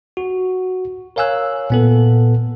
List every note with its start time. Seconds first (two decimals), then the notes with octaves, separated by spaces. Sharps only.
0.17 F#4
1.16 A#4 C#5 F5 G#5 E6 F#6
1.70 A#2 B3 A4